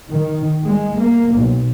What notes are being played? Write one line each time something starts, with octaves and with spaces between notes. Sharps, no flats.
D#3
G#3
A#3
B1